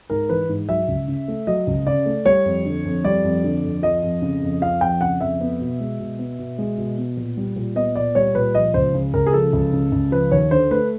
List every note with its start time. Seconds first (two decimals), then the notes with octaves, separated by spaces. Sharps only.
0.10 G#2 A#4
0.29 E3 B4
0.49 G#2
0.69 F#3 E5
0.88 C#2
1.08 C#3
1.28 A3
1.47 F#3 D#5
1.67 C#2
1.87 C#3 D5
2.06 A3
2.25 G3 C#5
2.45 F2
2.65 D3
2.85 F2
3.04 G3 D5
3.24 F2
3.44 D3
3.64 F2
3.83 F3 D#5
4.03 F2
4.22 C#3
4.42 F2
4.61 F3 F5
4.81 F2 G5
5.01 C#3 F#5
5.21 F2 E5
5.41 B3
5.60 B2
5.80 G#3
6.00 B2
6.19 B3
6.39 B2
6.58 G#3
6.78 B2
6.97 B3
7.17 A#2
7.37 G3
7.56 A#2
7.76 B3 D#5
7.96 A#2 D5
8.15 G3 C#5
8.35 A#2 B4
8.55 F3 D#5
8.74 C#2 C5
8.94 C#3
9.14 C#2 A#4
9.27 G#4
9.33 F3 A4
9.53 C#2
9.73 C#3
9.92 C#2
10.11 F3 B4
10.31 D#2 C#5
10.51 D3 C5
10.71 A3 B4